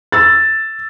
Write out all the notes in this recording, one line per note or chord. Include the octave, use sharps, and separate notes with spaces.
E6 A6